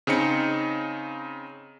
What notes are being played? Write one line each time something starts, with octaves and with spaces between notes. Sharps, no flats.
C#3 C4 D#4 C#7